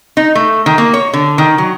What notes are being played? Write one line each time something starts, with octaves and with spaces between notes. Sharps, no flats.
D#4
A3
D#3
A#3
C#5
D3
D#3
F#3